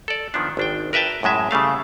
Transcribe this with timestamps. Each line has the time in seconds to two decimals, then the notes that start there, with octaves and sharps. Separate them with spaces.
0.08 A4 D5
0.34 D#3 F3 B3 D4
0.57 G#1 D4 G5
0.93 A#4 B4 E5 G5 A5
1.23 F#2 A2 G#3 E5
1.51 C#3 G3 A3 F5